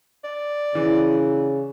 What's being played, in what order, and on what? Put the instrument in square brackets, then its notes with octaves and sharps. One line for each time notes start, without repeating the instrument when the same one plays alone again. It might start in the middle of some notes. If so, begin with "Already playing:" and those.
[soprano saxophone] D5
[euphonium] C#3 [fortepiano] E3